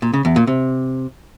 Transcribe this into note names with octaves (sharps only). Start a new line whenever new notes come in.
A#2
C#3
E2
A#2
C3